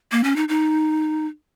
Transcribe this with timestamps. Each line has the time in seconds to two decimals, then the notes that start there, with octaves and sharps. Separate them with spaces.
0.12 A#3
0.24 C#4
0.36 D#4
0.49 D#4